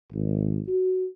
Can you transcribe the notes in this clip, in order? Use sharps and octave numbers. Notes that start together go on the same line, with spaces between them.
G#1
F#4